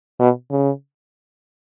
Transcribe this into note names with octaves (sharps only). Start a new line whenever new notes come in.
B2
C#3